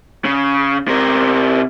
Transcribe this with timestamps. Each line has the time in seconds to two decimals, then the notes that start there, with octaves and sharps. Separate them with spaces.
0.25 C#3
0.87 C3 A#4